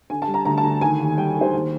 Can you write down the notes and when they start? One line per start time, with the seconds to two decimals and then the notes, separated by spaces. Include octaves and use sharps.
0.10 D3 G#5
0.22 A5
0.28 G3
0.34 A#5
0.45 D2 A#5
0.58 A5
0.63 D2
0.81 D#3 G#5
1.00 D#2
1.17 G3 G5
1.36 D#3
1.41 C5
1.53 D#2